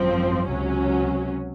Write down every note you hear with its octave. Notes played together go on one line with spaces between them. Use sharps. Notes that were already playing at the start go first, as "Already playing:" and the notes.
Already playing: G#1 F#2 F3 C4
C#2 C3 F#3 C#4